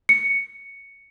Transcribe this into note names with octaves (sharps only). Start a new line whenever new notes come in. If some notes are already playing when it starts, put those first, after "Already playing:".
C#7